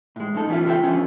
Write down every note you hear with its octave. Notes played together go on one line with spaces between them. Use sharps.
A2 G#3
F#2 A2 D#4 A4
E3 B3 C#4 F4 E5
C#2 F4 A4 A#4 E5 G5
D3 F3 B3 C#4